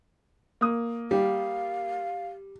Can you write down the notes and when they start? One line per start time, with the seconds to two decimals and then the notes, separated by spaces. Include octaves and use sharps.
0.61 A#3 D#6
1.11 G3 F5